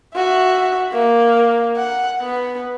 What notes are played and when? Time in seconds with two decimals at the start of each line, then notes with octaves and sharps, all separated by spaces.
0.15 F#4 E5
0.92 A#3
1.77 F#5
2.22 B3